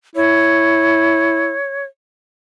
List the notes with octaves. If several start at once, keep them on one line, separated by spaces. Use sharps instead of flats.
E4 C#5